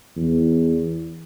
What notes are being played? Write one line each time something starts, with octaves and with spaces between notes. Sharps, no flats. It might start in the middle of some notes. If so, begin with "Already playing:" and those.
E2